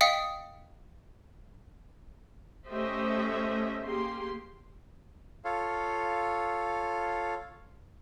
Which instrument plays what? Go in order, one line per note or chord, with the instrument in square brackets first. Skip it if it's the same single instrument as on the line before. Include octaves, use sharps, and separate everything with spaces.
[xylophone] D#5 F5 G5 D#6 B6 C#7
[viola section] A3 C#4 G4 C5 D#5 E5
A#3 G4 G#4 C6
[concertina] F4 A4 C#5 F5